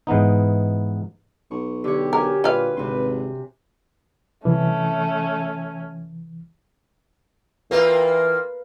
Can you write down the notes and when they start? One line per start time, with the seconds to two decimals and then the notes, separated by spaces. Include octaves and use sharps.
0.07 G#2 E3 B3 D#4
1.51 B1 C#6
1.84 D3 G4 C#5
2.13 F#4 G4 A#4 G5 G#5
2.44 A#2 G3 B4 F5
2.77 G#1 C3 C6
4.45 C2 E3 A3 C#4
7.71 E3 A#3 C4 F4 A#4 B4 F5